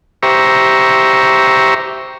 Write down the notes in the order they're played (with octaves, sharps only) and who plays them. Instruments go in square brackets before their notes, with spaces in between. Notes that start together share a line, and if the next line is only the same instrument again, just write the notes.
[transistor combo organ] G4 C5 E5 A#5 C#6